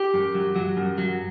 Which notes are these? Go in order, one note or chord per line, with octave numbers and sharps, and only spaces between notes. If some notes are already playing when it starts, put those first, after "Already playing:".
Already playing: G4
F#2
F#3
F#3
F#2
F#3